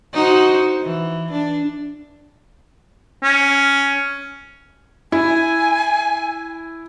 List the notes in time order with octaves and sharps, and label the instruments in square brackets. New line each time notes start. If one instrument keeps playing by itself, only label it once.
[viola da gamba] D#4 F#4 C5
E3
D4
[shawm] C#4
[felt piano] E4 [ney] G#5